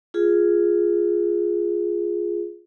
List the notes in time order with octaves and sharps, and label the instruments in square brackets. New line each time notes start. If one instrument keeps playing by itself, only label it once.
[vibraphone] F4 G#4